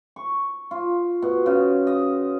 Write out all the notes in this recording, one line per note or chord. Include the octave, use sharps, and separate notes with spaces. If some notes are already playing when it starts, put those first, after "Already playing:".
C#6
F4
B2
C#3
D#5